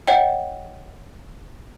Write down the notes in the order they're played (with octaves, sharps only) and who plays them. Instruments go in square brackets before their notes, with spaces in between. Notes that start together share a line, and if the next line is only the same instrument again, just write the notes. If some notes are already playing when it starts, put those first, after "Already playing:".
[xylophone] C#5 D#5 F#5 G5